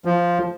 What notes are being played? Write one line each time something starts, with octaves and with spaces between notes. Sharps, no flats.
F3